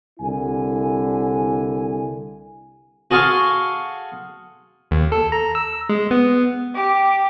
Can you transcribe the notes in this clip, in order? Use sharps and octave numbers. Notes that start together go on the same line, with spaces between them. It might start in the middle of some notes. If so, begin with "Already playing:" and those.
C2 D3 E4 G#5
F#4 G#4 A4 F5 C6 C#6
D#2
A4
A#5
E6
G#3
B3
G4